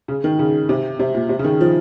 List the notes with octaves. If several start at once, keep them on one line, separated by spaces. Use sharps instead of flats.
C#3
D#3
C#3
C3
C3
A#2
C3
C#3
D#3
F3